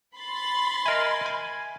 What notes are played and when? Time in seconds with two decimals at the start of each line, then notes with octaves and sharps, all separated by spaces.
0.17 B5 C6 A6
0.86 A#4 D#5 E5 G#5
1.26 G#5